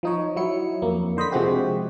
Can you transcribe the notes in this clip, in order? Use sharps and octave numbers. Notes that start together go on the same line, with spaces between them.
F3 D#4 C#5
F#3 E4 C#7
F2 A#3
D3 C5 D#5 B5 B6
C3 F3 G#3 C4 F#4 G4